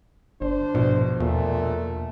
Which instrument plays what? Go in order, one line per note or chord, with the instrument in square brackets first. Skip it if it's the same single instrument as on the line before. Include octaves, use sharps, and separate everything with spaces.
[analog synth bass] G1 [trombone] D4 [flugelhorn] C5
[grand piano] A#1 B2 [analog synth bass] G#2
[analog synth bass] E2 [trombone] A#2 [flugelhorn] A3